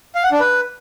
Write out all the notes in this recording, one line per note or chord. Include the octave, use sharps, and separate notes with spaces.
F5
F#5
D4
B4